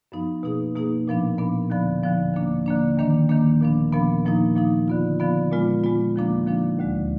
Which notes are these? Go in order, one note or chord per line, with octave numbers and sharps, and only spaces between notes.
F#2 F3 B3 D#4
B2 A#3 D#4 G#4
B2 A#3 D#4 G#4
A#2 F3 B3 D4
A#2 F3 B3 D4
D#2 D3 F3 B3
D#2 D3 F3 B3
D3 F3 A#3 D4
D3 F3 A#3 D4
D#2 D#3 A#3 D4
D#2 D#3 A#3 D4
A#2 F3 B3 D4
A#2 F3 B3 D4
A#2 F3 A#3 D#4
A#2 F3 A#3 D#4
D3 F3 B3 F4
D3 F3 B3 F4
A#2 G#3 B3 F4
A#2 G#3 B3 F4
D#2 D3 F3 A#3 D4
D#2 D3 F3 A#3 D4
D2 D3 G#3